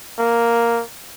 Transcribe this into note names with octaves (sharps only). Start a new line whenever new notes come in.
A#3